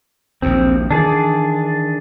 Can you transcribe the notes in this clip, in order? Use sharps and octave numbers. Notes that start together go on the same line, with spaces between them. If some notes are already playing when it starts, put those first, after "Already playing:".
A#1 D#2 C4
D#3 E3 D4 G#4 D5